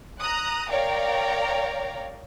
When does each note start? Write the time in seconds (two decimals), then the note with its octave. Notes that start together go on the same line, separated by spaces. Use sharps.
0.19 A#5 D#6 F#6
0.69 A#4 C#5 D5 F5 G5 A#5